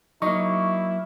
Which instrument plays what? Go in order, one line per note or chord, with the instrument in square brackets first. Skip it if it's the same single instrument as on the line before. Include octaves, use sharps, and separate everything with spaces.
[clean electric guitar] F#3 A#3 [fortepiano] D#4 [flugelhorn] E4 [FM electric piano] C#6